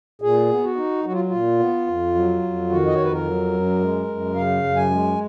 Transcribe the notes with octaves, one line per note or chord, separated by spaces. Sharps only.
A#2 G#4
B3
F#4
D#4
F#3 F#4
F4
A#2 F4
B3
F2
F#3
F2
D#3 F#4
D#5
F2 C#5
B4
A#4
F#3
F#2
G#3
F#2
C#3 F5
F#2
G#5
G#3